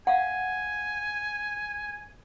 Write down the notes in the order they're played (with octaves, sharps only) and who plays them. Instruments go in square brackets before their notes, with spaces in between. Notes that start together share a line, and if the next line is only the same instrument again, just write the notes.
[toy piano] F5 F#5 [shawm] G#5